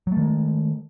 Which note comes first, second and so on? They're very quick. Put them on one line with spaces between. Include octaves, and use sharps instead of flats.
F#3 A3 D#3 G#3